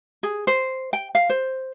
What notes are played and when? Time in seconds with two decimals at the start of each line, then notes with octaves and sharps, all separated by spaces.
0.23 G#4
0.47 C5
0.93 G5
1.15 F5
1.30 C5